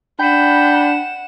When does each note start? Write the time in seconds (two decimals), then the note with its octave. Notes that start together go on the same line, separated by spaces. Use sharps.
0.20 D4 F#5 G5 B5 E7